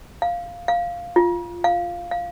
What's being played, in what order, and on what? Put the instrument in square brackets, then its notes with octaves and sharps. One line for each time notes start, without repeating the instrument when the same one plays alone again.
[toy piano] F5
F5
F4
F5
F5